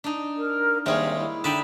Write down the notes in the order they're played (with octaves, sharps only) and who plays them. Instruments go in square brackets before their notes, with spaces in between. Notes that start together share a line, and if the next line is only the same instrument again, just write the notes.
[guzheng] D4 D#4
[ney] A#4
[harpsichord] D#2 C3 G3 [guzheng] G#3 G#4 C#5 [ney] E5
[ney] E4
[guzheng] D3 D#4 B5 [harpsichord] E5 G5 A5